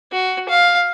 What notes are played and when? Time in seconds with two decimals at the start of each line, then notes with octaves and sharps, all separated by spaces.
0.12 F#4
0.49 F5